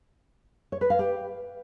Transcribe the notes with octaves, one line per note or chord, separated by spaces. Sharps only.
C#5
B4
F5
G4